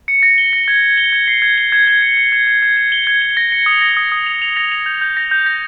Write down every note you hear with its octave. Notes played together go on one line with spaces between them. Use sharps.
C#7
A#6
G7
A#6
G#6
G#6
G7
G#6
C7
G#6
G7
G#6
G#6
C#7
G#6
G#6
G#6
G#6
G#6
G7
G#6
G7
A#6
C#7
D#6
A#6
D#6
D#6
F7
F7
A#6
F7
G6
G6
A#6
G6
A#6